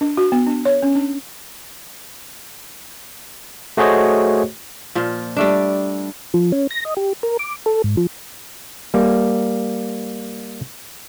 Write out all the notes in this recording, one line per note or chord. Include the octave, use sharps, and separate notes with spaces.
D4
F#4
B3
D4
C#5
C#4
D4
A3 F#4 G#4 C5 C#5 D#5
A#2 F3
G3 A3 D4
F3
C#4
A#6
D#5
G4
A#4
D6
A4
G#2
F3
G3 A#3